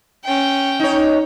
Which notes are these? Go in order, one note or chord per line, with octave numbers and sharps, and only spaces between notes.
C#4 G5
D#4 C#5